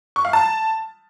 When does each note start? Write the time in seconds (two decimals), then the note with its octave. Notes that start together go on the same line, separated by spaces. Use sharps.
0.16 C#6
0.25 F5
0.33 A5